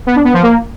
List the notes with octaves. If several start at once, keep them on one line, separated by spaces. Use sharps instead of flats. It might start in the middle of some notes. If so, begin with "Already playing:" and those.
B3
D4
B3
F3
A#3